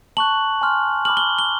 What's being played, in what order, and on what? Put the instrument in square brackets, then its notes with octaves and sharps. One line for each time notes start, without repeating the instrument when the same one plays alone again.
[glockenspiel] A5 C#6 F#6 F#7
G#5 C6 F6
B5 D6 F6 F#7
G7
G7